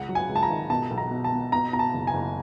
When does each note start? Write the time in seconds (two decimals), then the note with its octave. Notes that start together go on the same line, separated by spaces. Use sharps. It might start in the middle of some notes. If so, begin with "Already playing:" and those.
Already playing: C#2 F#5
0.09 F#3
0.15 G#5
0.29 C#2
0.36 A5
0.43 A#5
0.50 D#3
0.70 B2 A5
0.91 B1
0.98 A#5
1.11 B2
1.24 A5
1.32 B2
1.52 B2 A#5
1.73 B2 A#5
1.79 A5
1.94 F#1
2.07 G#5
2.13 F#1